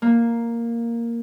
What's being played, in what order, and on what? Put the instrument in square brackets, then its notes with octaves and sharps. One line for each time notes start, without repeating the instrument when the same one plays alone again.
[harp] A#3